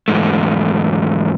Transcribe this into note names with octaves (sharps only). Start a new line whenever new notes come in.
E2 G#2 A3